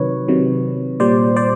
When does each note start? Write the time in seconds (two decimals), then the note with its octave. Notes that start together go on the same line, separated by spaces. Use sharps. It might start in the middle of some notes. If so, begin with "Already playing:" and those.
Already playing: C3 D#3 F#3 B4 C#5
0.28 C3 D#3 F#3
1.00 A#2 G3 C5 D5
1.36 C5 D5